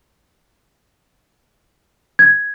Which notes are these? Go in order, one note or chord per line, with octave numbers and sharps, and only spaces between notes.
G#6